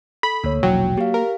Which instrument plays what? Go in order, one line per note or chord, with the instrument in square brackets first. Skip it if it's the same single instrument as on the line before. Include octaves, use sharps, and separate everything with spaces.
[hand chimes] A4 [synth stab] B5
[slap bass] D2 [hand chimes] A#3 C#5
[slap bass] E1 A#1 E3 [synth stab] F#3 [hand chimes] G5
[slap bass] A#3 [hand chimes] G4 F5
[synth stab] A#4